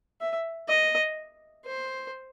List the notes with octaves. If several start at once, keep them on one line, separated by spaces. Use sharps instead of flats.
E5
D#5
C5